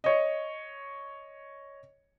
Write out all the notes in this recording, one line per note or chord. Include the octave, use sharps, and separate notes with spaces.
C#5 D#5